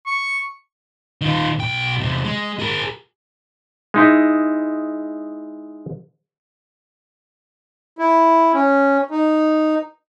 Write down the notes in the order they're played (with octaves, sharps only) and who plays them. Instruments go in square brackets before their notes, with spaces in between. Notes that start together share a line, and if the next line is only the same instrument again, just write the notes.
[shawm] C#6
[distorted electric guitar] D#3 F4
B1 G5
E2 C3
G#3
G#4 A#4
[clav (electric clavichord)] G#3 D#4 E4
[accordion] E4
C#4
D#4